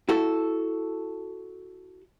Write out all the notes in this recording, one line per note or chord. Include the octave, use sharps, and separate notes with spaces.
E4 F#4 A4